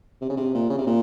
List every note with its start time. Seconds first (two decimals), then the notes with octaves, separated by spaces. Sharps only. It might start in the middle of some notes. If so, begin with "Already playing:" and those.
0.21 C3
0.29 C#3
0.37 C3
0.55 A#2
0.70 C#3
0.78 C3
0.87 A#2